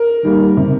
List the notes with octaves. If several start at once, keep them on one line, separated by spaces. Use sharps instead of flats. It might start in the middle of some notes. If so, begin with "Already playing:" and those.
Already playing: A#4
D#3 G3 A#3
C3